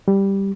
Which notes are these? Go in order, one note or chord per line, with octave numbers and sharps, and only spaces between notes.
G3